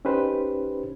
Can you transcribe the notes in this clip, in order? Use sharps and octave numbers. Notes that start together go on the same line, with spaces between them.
C#4 D#4 G4 B4 C5